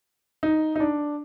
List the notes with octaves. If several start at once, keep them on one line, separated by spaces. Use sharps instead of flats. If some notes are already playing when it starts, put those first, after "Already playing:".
D#4
D#4
D4